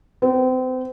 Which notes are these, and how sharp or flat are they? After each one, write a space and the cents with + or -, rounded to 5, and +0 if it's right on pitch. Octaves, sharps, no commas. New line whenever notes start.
C4 -35